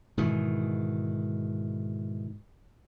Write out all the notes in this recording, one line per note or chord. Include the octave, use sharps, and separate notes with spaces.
G#2 B2 D#3 E3